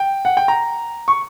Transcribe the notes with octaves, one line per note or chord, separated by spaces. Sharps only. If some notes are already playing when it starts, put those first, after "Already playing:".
Already playing: G5
F#5
G5
A#5
C#6